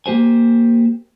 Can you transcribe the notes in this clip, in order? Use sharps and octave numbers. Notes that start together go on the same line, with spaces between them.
A#3 G4 C5 G#5